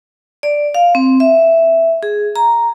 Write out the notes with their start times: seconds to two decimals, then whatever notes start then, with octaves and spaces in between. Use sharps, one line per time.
0.43 D5
0.75 F5
0.95 C4
1.20 E5
2.03 G#4
2.36 A#5